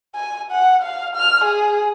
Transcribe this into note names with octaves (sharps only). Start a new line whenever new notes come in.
G#5
F#5
F5
F6
G#4